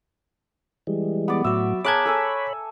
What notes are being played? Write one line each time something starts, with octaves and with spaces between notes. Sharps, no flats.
E3 G3 G#3
B3 D5
A2 F#3 F#4 E5
G#4 A#4 C#5 A5 B5 D6 F#6 G#6
A4 G#5 E6